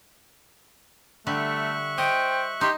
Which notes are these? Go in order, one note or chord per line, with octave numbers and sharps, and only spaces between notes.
D3 G3 A3 E5 C#6 F#6
C5 D#5 G5
D#4 G4 C6